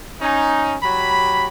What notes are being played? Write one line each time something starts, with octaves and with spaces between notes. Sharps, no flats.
C#4 D#4
F#3 G4 B5